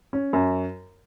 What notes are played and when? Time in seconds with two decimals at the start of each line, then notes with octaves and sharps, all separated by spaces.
0.13 C#4
0.33 F#2